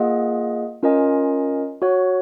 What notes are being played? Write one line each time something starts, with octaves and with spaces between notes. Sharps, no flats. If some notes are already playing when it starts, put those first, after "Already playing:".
Already playing: A#3 F4 G#4 D#5 F#5
C#4 F4 A#4 D#5 G#5
F#4 C#5 F#5